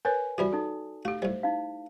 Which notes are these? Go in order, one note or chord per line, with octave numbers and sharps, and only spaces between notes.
A#4 B4 C#5 G#5
C3 E3 G3 F#4 D5 B5
D#4 A4
A3 F#4 G4
A2 G3 C5
D#4 E4 F5